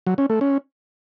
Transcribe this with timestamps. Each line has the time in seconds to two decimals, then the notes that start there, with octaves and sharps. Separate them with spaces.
0.07 F#3
0.18 C#4
0.30 A3
0.41 C#4